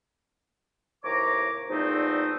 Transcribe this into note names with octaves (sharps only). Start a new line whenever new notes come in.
D#2 A2 C3 C#5 A#5 D6
E2 A#2 F3 A3 C4 D#4